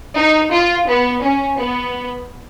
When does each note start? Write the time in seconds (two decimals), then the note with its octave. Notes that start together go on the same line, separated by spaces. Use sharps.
0.17 D#4
0.52 F4
0.87 B3
1.23 C#4
1.58 B3